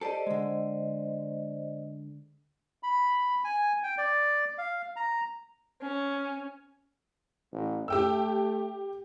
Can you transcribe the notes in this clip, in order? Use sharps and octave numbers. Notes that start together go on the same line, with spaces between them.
G4 A4 C5 D5 D#5
D3 G#3
B5
G#5
G5
D5
F5
A#5
C#4
A1
A3 G4 G5 E6